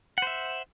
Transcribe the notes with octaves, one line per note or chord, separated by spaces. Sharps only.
C5 E5 F#5